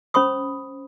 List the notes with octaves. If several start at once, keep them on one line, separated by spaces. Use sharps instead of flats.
C#4 C5 B5 C#6 D#6